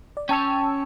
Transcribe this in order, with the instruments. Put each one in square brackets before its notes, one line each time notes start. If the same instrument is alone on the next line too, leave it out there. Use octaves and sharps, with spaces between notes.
[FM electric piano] D5
[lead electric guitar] C#4 C#5 [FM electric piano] G5 A5 E6